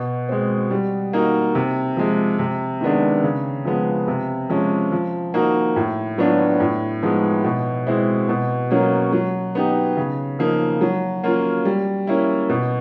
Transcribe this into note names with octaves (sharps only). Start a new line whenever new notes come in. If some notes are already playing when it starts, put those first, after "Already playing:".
Already playing: B2
G#3 C4
G3
A#3 D#4 F#4
C3
F3 G#3
C3
D#3 G#3 B3 D4
C#3
F3 G#3 B3
C3
F3 G#3 C#4
F3
A#3 D#4 F#4
A2
F#3 B3 D4 F4
A2
F3 G#3 B3 D#4
B2
G#3 C4 E4
B2
F#3 A#3 C#4
F#3
B3 D#4 G4
C#3
F3 A#3 D#4
F#3
A#3 C#4 F4
G3
A#3 C#4 E4
B2